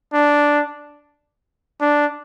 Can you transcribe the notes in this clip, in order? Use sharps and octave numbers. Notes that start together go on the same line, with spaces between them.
D4
D4